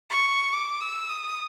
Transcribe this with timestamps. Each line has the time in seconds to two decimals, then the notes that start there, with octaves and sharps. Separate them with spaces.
0.10 C#6
0.53 D6
0.81 E6
1.09 D#6